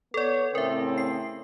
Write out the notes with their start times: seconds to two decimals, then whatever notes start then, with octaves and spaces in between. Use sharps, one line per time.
0.14 B3 A4 C#5 D5
0.55 A2 C#3 C4 A#4 E5
0.98 C7